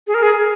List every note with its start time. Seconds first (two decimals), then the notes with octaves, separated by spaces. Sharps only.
0.07 G#4
0.14 A#4
0.23 G#4